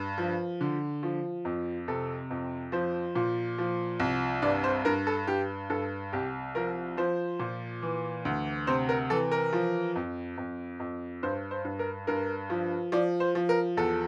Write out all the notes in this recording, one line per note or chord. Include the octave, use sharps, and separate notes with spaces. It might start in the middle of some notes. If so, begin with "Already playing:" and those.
Already playing: G2
F3
D3
F3
F2
C3 A4
F2
F3 C5
A#2
F3
C2
G2 D5
C5
G2 A#4
A4
G2 G4
G2 A4
C2 G4
F3 A#4
F3 C5
A#2
E3
D2
C3 C5
A#4
E3 A4
A#4
F3
F2
F2
F2
G2 C5
C5
G2
A#4
G2 A#4
F3
F3 D5
C5
F3
A#4
E2 A4